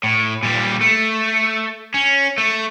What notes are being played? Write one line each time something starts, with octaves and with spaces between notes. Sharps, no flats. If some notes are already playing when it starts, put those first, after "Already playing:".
A2
A#2 G3
A3
C#4
A3